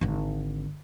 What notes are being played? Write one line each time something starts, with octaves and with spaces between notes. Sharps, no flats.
G#1 D3